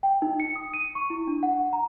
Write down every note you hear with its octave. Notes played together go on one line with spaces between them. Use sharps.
G5
D#4
C#7
D#6
D#7
C#6
E4
D4
F#5
A#5